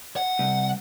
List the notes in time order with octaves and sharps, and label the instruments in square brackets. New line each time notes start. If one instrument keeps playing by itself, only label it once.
[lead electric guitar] F#5
[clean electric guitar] C2